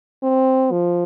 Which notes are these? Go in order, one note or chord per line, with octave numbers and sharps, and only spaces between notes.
C4
F3